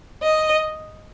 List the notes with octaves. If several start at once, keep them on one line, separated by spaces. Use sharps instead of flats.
D#5